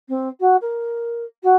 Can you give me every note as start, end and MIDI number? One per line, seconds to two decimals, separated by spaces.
0.08 0.28 60
0.40 0.56 66
0.61 1.24 70
1.43 1.56 66